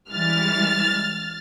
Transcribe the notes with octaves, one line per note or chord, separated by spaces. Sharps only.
E3 G3 G#3 F6 A6